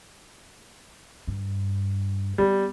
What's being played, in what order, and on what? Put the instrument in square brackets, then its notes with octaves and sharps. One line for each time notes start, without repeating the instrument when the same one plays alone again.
[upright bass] G2
[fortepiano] G3 [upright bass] B3